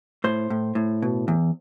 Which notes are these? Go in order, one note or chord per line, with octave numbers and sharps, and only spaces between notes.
A2 C5
A2
A2
B2
E2